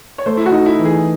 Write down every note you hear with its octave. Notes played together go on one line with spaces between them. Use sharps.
C#5
A3 C5
E4
F#4
D#4
E4
E3
G#4